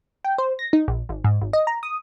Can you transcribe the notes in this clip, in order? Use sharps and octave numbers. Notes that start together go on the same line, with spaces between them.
G5
C5
A#6
D#4
A#1
G#1
G#2
G#1
D#5
A#5
D#6